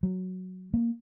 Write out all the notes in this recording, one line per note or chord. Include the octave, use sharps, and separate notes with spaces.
F#3
A#3